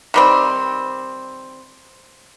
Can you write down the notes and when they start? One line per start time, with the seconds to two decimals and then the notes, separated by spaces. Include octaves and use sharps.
0.14 D#3 G3 C4